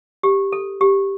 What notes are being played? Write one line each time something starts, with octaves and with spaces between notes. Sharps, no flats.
G4
A4
G4